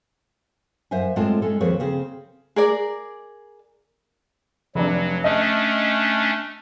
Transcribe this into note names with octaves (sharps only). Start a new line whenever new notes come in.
F#2 C5 E5 F5 G#5
A2 G#3 C4 F4 A4 A5
G#3 C#4 A4
D#2 F3 C4 G#4 B4 C#5
C#3 C4 G#4
G#4 A#4 D5
F1 F#3 D4
A3 C#4 D4 D#5